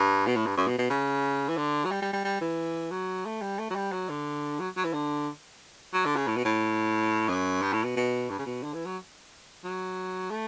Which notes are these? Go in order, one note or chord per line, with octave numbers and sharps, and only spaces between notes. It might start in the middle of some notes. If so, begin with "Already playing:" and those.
Already playing: G2
B2
A2
G2
F#2
B2
B2
C#3
E3
D3
F#3
G3
G3
G3
G3
E3
F#3
A3
G3
A3
F#3
G3
F#3
D3
F#3
F#3
E3
D3
F#3
D3
C#3
A2
B2
A2
F#2
G2
A2
B2
B2
G2
C#3
B2
D3
E3
F#3
F#3
A3